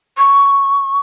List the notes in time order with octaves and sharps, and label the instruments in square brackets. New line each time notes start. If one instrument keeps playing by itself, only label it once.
[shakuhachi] C#6